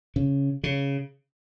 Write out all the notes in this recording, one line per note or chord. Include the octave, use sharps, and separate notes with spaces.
C#3
C#3